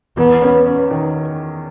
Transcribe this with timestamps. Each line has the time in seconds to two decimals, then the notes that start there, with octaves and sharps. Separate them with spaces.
0.17 E2 B3
0.42 C#4
0.66 C#4
0.91 D#3